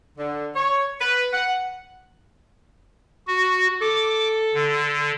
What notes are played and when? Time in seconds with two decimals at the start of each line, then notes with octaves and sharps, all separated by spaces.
0.17 D3
0.55 C#5
1.01 B4
1.33 F#5
3.27 F#4
3.81 A4 D6
4.54 D3